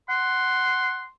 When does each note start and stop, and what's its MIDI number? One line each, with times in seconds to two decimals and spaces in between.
0.09 1.02 78
0.09 1.11 84